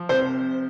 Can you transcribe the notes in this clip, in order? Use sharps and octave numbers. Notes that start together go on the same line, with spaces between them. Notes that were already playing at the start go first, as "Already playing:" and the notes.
Already playing: F3
C3 C5